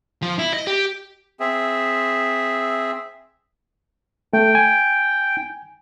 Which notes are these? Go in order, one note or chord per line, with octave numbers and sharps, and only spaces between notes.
F3 F4
E4
D#5
G4
C4 G#4 E5
A3 G5
G#5